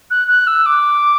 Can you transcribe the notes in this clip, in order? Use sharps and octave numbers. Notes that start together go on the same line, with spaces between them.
F#6
F#6
E6
D6